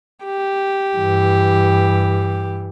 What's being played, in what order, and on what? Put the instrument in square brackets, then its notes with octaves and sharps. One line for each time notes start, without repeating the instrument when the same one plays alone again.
[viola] G4
[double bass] G2 E3